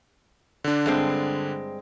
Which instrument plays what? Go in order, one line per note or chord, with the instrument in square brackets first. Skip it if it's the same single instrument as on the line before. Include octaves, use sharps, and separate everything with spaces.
[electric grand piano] D3 D4
[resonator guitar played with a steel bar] G2 G#3 C4